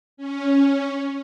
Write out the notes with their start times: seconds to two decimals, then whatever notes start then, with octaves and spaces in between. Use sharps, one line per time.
0.17 C#4